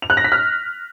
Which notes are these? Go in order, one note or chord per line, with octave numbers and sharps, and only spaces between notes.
F7
F#6
A#6
B6
F6